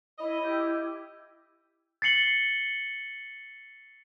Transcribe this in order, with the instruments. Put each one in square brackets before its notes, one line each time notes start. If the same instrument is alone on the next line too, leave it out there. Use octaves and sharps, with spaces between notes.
[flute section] E4 C#5 B5 [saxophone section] D#5
[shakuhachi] E4 [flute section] G4
[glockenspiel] A6 C7 C#7 F#7 G7